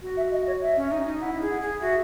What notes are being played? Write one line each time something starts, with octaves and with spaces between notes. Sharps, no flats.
F#4
E5
D#5
C#5
E5
C#4
D#4
D#4
E4 F#5
G#4
F#5
G#4
F#4 E5